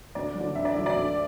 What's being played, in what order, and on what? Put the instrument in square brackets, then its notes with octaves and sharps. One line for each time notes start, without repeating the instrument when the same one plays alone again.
[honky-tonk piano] D2 D5
F#3
D3
D2 E5
D5
D3 F#3
D5
D2